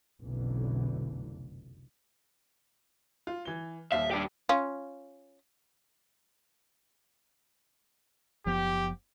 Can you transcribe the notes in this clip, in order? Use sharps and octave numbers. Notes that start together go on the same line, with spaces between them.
F1 B1 F#2 D3 E3
F4
E3 G7
D#1 D#2 E5 F5
G2 G4
C#4 F4
F#1 F3 B3 G4